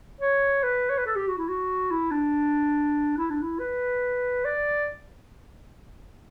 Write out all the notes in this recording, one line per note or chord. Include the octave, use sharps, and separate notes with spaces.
C#5
B4
C#5
B4
A4
G4
F#4
E4
F#4
E4
D4
E4
D4
E4
B4
D5